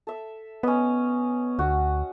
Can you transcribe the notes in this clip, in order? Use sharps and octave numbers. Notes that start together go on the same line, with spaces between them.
A4 E5
B3 C#4 D#5
D2 F#4